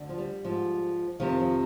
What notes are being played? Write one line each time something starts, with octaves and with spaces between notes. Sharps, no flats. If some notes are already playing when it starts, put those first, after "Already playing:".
Already playing: D2 D3
F3
G3
G#2 F3
F2 C3 D#3 F3
F3